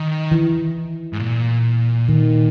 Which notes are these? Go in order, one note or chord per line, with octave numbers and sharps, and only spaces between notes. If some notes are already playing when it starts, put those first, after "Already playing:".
Already playing: D#3
E3
G#2
A#2
D#3